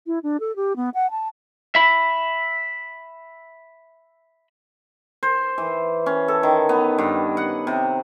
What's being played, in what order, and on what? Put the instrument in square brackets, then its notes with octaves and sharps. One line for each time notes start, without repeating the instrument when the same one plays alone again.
[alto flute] E4
D4
A4
G4
B3
F#5
A5
[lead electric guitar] E5 B5
[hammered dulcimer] C5
E3
C#4
A4
D#3
B3
G2
F#5
C3